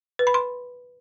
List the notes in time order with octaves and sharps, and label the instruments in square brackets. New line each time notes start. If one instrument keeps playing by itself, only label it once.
[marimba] B4
B5
C6